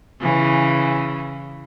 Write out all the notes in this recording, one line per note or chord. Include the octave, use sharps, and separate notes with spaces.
C#3 E3